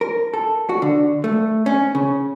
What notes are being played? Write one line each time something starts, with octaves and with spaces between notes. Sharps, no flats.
A#4
A4
F#4
D3
A3
C#4
C#3